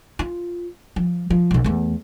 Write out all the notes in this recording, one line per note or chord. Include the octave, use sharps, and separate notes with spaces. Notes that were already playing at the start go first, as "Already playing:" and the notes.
F4
F3
F3
B1 C#3
E2 A3